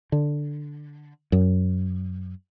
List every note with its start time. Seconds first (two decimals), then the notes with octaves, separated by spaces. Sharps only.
0.12 D3
1.32 F#2